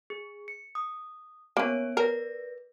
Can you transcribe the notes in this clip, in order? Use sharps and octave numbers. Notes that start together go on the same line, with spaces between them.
G#4
C#7
D#6
A#3 B3 C#4 C#5 D7
A#4 B4 D5 A#6